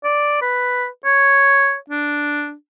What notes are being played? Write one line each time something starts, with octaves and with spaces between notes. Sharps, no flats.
D5
B4
C#5
D4